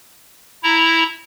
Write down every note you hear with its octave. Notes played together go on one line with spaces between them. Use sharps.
E4 A#5